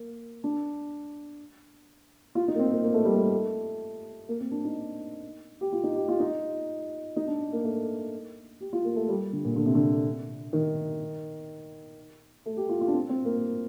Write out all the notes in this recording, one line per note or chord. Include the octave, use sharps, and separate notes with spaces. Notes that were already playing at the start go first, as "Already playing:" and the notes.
Already playing: A#3
D4
F4
D#4
A#3
C4
A#3
A#3
A3
G3
A3
A#3
C4
D4
D#4
G4
F4
D#4
G4
F4
D#4
D#4
D4
A#3
A3
G4
F4
A#3
A3
G3
D3
A#2
D3
C3
D3
D#3
A3
G4
F4
F4
D4
C4
C4
A#3